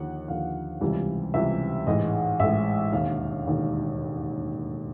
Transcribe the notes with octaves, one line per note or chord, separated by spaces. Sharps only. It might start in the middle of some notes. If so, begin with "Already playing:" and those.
Already playing: D#2 D3 F3 F#5
D#2 D3 F3 F5
C#2 C3 E3 G3
C#2 C3 E3 G3 E5
A1 G#2 E3 G#3 D#5
A1 G#2 E3 G#3 E5
E1 D#2 D3 F5
E1 D#2 D3